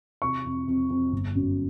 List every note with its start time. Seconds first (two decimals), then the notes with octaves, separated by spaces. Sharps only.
0.22 C3 C#6
0.45 F2
0.68 F2
0.90 F2
1.12 G1
1.35 F#2